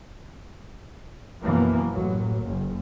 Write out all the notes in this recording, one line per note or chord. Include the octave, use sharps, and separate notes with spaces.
F#2 B2 E3 F3 A#3 B3
A1 F#3 A#3
F#1